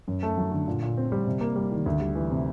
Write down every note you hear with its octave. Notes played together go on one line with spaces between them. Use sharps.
F#2
A3
F#3
D3
A#2
A#2
C4
G3
C3
A#3
G3
D#3
D2
G3
E3
C3